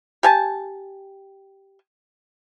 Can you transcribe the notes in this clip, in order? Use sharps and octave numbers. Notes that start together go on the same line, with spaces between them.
G4 G#5 A5